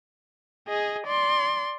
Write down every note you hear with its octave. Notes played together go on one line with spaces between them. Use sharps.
G#4 D#5
D5 C6